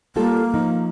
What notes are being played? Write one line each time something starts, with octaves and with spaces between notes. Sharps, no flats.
G3 A#3 F4 A4
F3 D#4